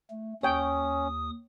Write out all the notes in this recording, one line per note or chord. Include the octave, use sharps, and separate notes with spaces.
A3
D#2 C#4 C#5 G5 D#6